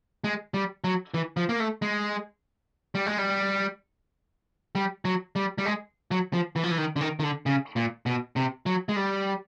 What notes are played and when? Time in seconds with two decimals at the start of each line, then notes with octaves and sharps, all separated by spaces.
0.24 G#3
0.54 G3
0.84 F#3
1.14 E3
1.37 F3
1.49 A#3
1.60 A3
1.82 G#3
2.95 G3
3.06 G#3
3.18 G3
4.75 G3
5.05 F#3
5.36 G3
5.58 G3
5.66 G#3
6.11 F#3
6.33 F3
6.56 E3
6.63 F3
6.71 E3
6.78 D#3
6.96 D3
7.01 D#3
7.20 D#3
7.23 D3
7.46 C#3
7.76 A#2
8.06 B2
8.36 C3
8.66 F#3
8.89 G#3
8.96 G3